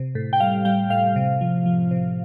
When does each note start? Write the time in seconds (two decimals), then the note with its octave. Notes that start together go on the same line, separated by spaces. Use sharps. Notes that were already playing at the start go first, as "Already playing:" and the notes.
Already playing: C3
0.15 A2
0.33 G5
0.40 G3 F5
0.65 G3 G5
0.90 A2 F5
1.16 C3
1.41 F3
1.66 F3
1.91 C3